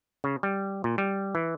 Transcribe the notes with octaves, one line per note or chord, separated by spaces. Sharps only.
C#3
G3
A#2
G3
E3